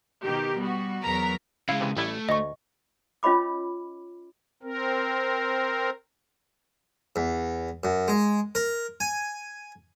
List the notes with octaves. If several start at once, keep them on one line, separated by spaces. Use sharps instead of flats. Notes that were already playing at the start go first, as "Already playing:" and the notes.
B2 D#3 G4 A#4
G3 B3 F#4
E2 F#3 B3 A#4 A#5 B6
C#3 G#3 E4 F5
C3 E3
A1 G3 A3 E4
D2 D#5 C#6
C#4 F4 C#5 D#5 B5 D6
C4 A#4
E2
F#2
G#3
A#4
G#5